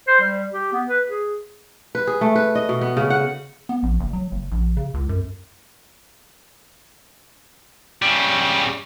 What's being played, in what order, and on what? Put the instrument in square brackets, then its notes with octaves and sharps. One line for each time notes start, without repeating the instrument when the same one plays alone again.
[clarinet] C5
G3
G4
B3
B4
G#4
[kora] B4
G#4
A3
B4
D#5
B2
B3
C#3
F#5
[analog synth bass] B3
A#1
F#1
F#3
F#1
A#1
C#3
C#2
F#2
[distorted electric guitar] C#3 G3